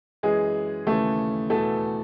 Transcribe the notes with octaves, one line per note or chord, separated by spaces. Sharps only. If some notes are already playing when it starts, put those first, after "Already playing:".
F#2 E3 G#3 G#4
D#2 C#3 E3 A3 A4
E2 B2 A3 A4